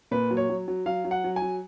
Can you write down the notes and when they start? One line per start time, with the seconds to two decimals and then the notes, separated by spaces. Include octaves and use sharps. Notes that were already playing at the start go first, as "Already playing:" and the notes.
0.11 A#2 B4
0.31 F#3
0.37 C#5
0.50 F#3
0.68 F#3
0.86 F#3 F5
1.05 F#3
1.11 F#5
1.24 F#3
1.36 G#5
1.42 F#3